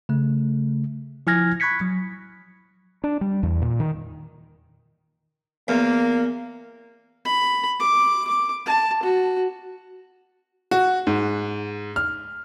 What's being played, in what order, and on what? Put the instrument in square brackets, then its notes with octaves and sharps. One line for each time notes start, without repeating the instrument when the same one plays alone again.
[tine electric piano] C#3 A3
F3 E4 G#5 F6 G#6 A#6
B5 C#6 F#6 G#6 B6 C#7
F#3
[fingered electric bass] D4
G3
E2
A#2
D#3
[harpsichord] E2 [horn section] A#3
[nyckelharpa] B5
D6
D6
A5
F#4
[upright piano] F#4
G#2
F6